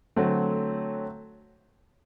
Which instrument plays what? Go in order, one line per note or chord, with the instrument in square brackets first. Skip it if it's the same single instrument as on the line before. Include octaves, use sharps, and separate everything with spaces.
[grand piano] D3 F#3 A3 C4